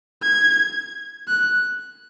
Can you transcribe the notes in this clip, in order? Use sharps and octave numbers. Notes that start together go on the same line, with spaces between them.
G#6
F#6